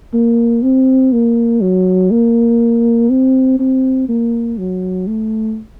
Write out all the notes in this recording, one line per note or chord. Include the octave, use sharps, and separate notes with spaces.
A#3
C4
A#3
F#3
A#3
C4
C4
A#3
F#3
A3